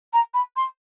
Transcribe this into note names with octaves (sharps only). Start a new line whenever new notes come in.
A#5
B5
C6